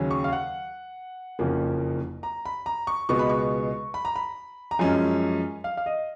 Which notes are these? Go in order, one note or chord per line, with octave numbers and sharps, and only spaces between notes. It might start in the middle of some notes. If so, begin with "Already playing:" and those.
Already playing: D#2 C#3 F#3 C#4
C#6
F5
F#5
F#1 F2 F3 A#3 C#4
A#5
B5
A#5
C#6
C#2 B2 G#3 B3 C#6
B5
C#6
B5
A#5
B5
A#5
F#2 F3 G#3 C#4 G#5
F5
F5
D#5